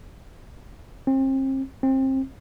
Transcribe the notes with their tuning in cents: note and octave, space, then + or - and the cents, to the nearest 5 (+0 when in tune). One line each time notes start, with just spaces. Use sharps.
C4 +35
C4 +25